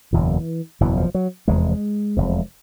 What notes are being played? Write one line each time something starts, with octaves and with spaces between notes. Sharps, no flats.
F#1 E2 B2 E3
F#1 E2 B2 E3
F3
F#3
F1 E2 C3 G#3
F1 E2 C3